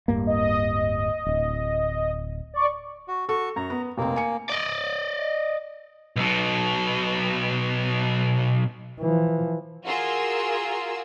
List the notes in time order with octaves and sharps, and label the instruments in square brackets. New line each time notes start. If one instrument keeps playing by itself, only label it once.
[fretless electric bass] D1 G2 A#3
[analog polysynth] D#5
[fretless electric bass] D1
[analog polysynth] D5 C#6
[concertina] F#4
[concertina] F#4 C#6 [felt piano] A4
[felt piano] F#2 [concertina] A#5
[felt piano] B3
[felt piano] F1 C4 [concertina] A#3
[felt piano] G#5 C#7
[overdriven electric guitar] D5 D#5
B1 B2
[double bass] E3 F3
[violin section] F4 F#4 G#4 A#4 C6 E6